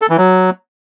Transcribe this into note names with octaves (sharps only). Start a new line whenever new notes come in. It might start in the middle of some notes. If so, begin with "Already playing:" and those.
A4
E3
F#3